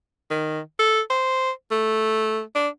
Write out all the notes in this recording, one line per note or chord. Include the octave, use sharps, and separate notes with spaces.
D#3
A4
C5
A3
D4